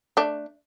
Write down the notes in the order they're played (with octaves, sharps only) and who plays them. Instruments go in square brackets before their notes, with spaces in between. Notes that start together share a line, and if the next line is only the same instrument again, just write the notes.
[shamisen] A3 D4